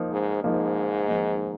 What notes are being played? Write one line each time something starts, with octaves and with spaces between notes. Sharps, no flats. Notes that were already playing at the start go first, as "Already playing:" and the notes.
Already playing: F3 A#3 D#4
G#2
G#2 F3 A#3 D#4
F3 A#3 D#4